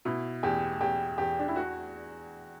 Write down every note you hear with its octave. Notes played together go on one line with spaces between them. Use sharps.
B2 E4
E2 G4
E2 G4
E2 G4
D4
E4
F#4